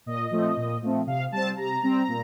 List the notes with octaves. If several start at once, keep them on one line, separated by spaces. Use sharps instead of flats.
A#2 D#5
F3 A3 C4
A#2
F3 A3 C4
C3 F5
G3 C4 A5
C3 A#5
G3 C4
A#2